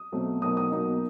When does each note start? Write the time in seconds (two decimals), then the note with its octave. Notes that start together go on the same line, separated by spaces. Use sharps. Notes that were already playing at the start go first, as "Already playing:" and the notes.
Already playing: D#6
0.12 B2 F#3 A3 C4
0.42 B2 F#3 A#3 D#4 D#6
0.57 D#6
0.71 B2 F#3 A#3 D#4